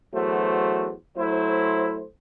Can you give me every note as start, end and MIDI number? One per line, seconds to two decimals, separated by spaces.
0.13 0.93 40
0.13 0.93 54
0.13 0.93 57
0.13 0.93 66
0.13 0.93 72
1.17 2.04 54
1.17 2.04 57
1.17 2.04 64
1.17 2.04 72